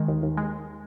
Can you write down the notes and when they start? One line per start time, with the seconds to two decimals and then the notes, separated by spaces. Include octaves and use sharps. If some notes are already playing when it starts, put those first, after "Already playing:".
Already playing: D#3 G#3
0.08 D#2
0.23 D#2
0.37 G#3